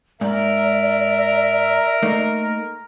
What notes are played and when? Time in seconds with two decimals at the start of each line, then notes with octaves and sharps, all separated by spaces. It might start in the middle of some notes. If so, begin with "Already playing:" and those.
0.21 G#2 A#4 D5 E5
2.03 A3 A#3 D#4